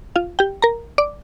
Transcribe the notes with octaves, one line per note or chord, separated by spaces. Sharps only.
F4 F5
G4 G5
A#4 A#5
D5 D6